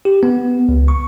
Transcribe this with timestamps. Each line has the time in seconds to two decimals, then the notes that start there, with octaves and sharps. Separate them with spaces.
0.05 G4
0.23 B3
0.69 C#2
0.88 C#6